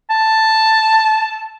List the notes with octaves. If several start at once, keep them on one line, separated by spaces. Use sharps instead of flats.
A5